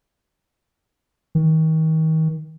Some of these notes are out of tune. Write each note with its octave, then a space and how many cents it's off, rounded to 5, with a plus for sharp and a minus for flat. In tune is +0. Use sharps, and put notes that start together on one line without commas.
D#3 +35